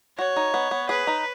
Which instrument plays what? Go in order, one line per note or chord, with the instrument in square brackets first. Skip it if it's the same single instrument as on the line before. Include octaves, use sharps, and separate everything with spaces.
[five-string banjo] F#4 [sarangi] C#5
[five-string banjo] D#4
B3
B3
[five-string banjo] G#4 [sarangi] B4
[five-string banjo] D#4